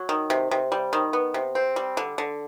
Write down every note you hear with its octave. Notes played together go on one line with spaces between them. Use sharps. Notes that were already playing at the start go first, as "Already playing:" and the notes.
Already playing: F#3
D#3
C3
C3
G3
D#3
B3
C3
C4
G3
D3
D3